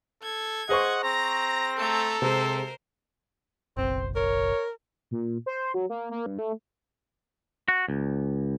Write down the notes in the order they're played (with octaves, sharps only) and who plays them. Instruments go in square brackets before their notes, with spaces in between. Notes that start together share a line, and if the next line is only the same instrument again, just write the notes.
[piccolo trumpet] A4 [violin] G#6
[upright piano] G#4 C5 C#6 [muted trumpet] D#5 [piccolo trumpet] F#5
[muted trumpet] C4 [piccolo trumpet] A#5 [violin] A#6
[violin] A3 A#5 [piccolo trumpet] A4
[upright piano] C3 G#3 [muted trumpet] C4 [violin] A#4 C5
[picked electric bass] F#1 B1 [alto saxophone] C4 [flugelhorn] C5
[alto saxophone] A#4 [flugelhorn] C#5
[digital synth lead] A#2
C5
F#3
A#3
A#3
G2
A3
[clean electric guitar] F#4
C#2